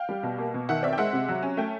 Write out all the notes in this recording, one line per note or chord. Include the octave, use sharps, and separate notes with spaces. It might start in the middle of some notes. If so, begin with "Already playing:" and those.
Already playing: F5 G5
G3
B2
A#3
B2
D#3 E5 F#5
C4 D5 E5
G5
G#3 E5 F#5
C3
F#3
C#4
A3 G5